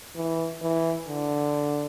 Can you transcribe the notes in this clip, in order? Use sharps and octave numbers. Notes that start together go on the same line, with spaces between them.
E3
E3
D3